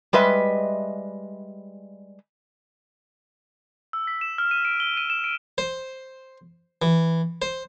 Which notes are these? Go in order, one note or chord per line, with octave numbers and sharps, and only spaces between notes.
G3 G#3 B4 D#5 E5
E6
B6
E7
F6
D#7
D7
G7
D#7
E7
D7
C5
E3
C5